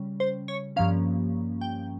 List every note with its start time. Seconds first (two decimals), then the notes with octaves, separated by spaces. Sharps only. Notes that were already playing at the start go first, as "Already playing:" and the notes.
Already playing: C#3 G3 C#4
0.20 C5
0.48 C#5
0.76 G2 F3 A#3 C#4 F5
1.61 G5